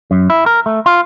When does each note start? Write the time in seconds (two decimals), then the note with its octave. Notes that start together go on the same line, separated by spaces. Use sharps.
0.11 F#2
0.30 E4
0.46 A#4
0.66 A3
0.86 F4